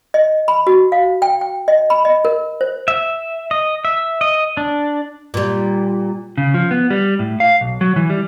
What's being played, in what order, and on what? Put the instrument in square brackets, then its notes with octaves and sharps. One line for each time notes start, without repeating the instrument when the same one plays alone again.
[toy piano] D#5
B5
F#4
F5
G5
G5
D#5
B5
D#5
A#4
C5
[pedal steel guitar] E5
D#5
E5
D#5
D4
[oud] A#2 G3
[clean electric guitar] C#3
F3
B3
G3
A2
F5
B1
F#3
E3
G3